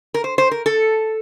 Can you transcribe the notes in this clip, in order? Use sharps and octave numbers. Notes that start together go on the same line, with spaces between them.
A#4
C5
C5
A#4
A4